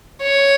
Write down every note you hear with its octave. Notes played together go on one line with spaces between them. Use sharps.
C#5